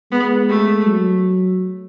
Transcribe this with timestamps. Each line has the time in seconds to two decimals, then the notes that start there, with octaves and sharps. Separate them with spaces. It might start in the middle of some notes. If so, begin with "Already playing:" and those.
0.11 G#3 B3
0.49 A3
0.86 F#3